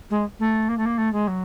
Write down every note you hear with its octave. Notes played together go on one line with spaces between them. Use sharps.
G#3
A3
A#3
A3
A#3
A3
G#3
F#3